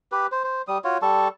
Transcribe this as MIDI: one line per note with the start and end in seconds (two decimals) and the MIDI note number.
0.12 0.27 67
0.12 0.27 71
0.32 0.44 72
0.44 0.62 72
0.68 0.78 55
0.68 0.78 87
0.84 0.98 65
0.84 0.98 66
0.84 0.98 73
1.02 1.28 55
1.02 1.28 69
1.02 1.28 81
1.02 1.28 85